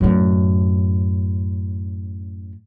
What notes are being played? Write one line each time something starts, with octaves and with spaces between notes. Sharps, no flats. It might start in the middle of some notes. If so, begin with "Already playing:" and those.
F#2 A2